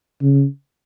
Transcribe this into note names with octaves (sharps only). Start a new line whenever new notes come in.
C#3